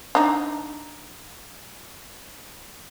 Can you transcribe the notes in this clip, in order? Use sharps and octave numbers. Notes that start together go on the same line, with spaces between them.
D4 D#4